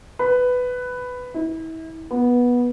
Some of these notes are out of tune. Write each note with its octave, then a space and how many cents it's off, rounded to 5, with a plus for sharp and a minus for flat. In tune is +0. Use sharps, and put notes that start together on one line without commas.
B4 +10
E4 -35
B3 -15